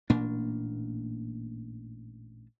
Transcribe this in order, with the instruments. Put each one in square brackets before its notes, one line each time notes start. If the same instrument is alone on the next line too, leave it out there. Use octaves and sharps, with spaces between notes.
[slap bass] A1 A#2 A#3 D4